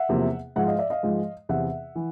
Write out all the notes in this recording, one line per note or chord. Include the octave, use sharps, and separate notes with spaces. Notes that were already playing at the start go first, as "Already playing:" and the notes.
Already playing: E5 F#5
E2 C3 F3 A#3
G#2 F3 G#3 E5 F#5
D#5 F5
D5 E5
D#5 F5
G#2 F3 G#3
E2 C3 E3 E5 F#5
E3